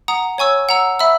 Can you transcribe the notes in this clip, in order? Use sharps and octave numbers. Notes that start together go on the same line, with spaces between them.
F#5 A#5 D#6
C#5 G#5 C#6 E6
F#5 A#5 E6
E5 B5 E6